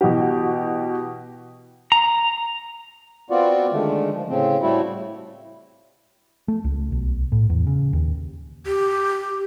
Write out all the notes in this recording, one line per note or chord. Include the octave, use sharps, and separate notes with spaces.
B2 E3 F#4 G4
A#5
B3 C4 F4 F#4 D5
D3 D#3 G#3 A3
F3
A2 C#3 C4
A2 G3 A3 E4 F#4
A3
C#2
B1
A2
E2
C#3
D#2
G4